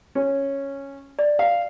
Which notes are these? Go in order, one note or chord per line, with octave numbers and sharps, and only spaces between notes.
C#4
D5
F5